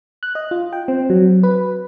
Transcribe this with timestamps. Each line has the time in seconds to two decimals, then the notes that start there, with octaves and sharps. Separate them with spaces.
0.23 F#6
0.35 D#5
0.51 F4
0.73 G5
0.88 C4
1.10 F#3
1.43 B4